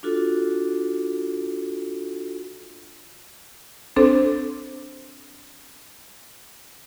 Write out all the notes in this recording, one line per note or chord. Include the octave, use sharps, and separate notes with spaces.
D4 F4 F#4 A4
C4 D4 A4 C5